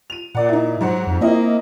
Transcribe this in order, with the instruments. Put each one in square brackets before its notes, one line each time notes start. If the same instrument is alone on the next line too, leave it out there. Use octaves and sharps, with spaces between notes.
[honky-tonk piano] D#7 F7
[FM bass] A#2 [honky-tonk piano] D5 F#5
[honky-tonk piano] D#4 E4
[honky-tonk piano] G#2 C5 F#5 [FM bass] F#3
[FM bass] F2
[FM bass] A#3 [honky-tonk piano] C4 E4 D#5